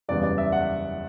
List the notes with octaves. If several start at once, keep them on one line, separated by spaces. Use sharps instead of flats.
F#1 E2 C#3 G3 B3 D5
D5
E5
F#5